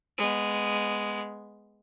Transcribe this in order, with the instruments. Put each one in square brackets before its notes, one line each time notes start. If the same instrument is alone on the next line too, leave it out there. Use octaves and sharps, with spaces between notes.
[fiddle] G#3 B3